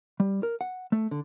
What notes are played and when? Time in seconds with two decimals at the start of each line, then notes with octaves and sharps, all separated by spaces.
0.20 G3
0.43 A#4
0.61 F#5
0.92 A3
1.11 D3